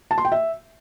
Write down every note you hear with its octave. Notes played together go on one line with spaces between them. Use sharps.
A5
C6
G5
E5